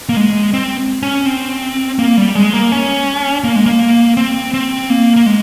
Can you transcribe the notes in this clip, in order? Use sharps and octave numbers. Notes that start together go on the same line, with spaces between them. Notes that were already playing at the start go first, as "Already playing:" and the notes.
A#3
G#3
C4
C#4
C4
A#3
G3
G#3
A#3
C#4
A#3
G#3
A#3
C4
C4
A#3
A#3
G#3